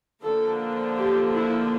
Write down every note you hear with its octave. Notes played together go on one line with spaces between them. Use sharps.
D3 F3 A#3 D4 A4
G4
E4